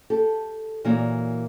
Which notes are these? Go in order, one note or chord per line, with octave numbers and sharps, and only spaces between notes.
G4 A4
A#2 E3 A#3 F#4 C#5 D5